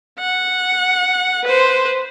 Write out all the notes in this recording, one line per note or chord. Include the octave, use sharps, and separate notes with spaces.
F#5
B4 C5